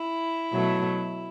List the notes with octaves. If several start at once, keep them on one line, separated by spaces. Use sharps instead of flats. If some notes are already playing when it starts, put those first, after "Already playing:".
Already playing: E4
B2 F#3 A3